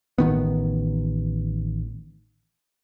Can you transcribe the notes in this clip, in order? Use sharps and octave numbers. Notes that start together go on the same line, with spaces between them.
A1 D#3 B3